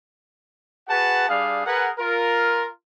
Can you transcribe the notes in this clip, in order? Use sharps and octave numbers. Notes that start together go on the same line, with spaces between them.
F#4 G#4 B4 F#5 A5
G3 D4 G#4 F5
G#4 A#4 B4 F#5
F4 A#4